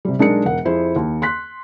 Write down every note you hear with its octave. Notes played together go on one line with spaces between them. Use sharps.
C3 G3
B1 G#3 D4 D#4 A#4 C#7
E1 A#4 F#5
F2 E4 G#4 C5
D#2
C6 F#6 B6